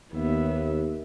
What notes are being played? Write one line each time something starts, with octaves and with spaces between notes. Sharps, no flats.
D#2 B3 E5